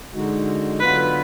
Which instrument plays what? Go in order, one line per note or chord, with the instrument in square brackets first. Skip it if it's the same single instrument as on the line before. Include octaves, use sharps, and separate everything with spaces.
[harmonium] D3 G#3 D#4 F#4
[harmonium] D3 F#3 B3 F4 [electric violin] B4